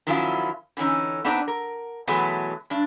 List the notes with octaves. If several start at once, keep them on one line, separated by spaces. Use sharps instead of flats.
D#3 F3 F#3 C#4 E4 F4
D3 E3 C4 C#4 D#4
B3 C4 D4 D#4 D5
A#4
B2 E3 F#3 G#3 A3 B3
G2 D4